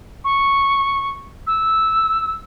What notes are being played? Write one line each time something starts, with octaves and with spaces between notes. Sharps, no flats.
C#6
E6